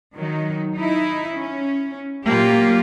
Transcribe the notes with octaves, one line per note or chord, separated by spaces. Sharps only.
D#3 F#3 D#4
D#4 E4
C#4
A#2 F#3 A#3 F4 G4